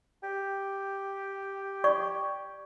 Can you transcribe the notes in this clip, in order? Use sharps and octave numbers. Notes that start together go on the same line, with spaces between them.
G4
D5 C#6